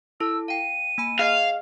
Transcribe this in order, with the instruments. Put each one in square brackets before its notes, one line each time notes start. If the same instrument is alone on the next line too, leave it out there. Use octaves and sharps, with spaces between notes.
[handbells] E4 A4 A5 [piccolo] E6
[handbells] F5 G5 [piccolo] D#7
[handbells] A#3 G#5 B5
[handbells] G#4 D#5 [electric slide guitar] F5